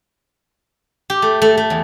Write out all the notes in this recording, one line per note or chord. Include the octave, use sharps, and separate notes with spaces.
G4
A3
A3
A3
E2